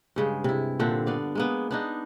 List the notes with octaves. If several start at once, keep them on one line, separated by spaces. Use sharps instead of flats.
G2 C#3 G#3
C3 E4
A#2 D3 C4 D4
B3 D5 F5
G#3 A#3 B3
B3 D4 D#4